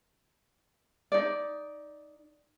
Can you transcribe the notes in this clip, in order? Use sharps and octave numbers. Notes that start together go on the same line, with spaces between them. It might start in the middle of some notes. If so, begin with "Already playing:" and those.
D#4 D5